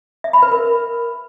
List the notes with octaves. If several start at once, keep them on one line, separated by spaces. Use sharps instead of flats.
E5
B5
B4
A#4